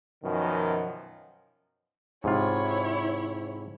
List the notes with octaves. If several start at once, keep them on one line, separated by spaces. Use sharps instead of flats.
F#2 B2 D#3 F3
G#2 C3 E4 F4 C#5